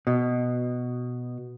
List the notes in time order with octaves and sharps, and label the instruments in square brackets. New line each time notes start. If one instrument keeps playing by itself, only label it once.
[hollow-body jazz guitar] B2